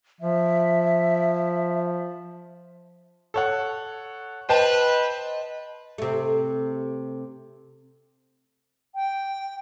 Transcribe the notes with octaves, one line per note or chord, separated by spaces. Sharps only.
F3 E5
A4 C#5 F#5
B4 C5 D#5 G5 A5
C3 A3
G5